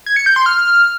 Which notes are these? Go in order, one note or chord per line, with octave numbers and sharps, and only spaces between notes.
G#6
C#7
G6
C6
F6